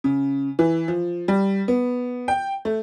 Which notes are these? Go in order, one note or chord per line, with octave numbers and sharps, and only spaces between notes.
C#3
E3
F3
G3
B3
G5
A3